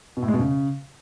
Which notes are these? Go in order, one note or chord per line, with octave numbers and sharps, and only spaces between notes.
B2
A2
G#3
B2
C#3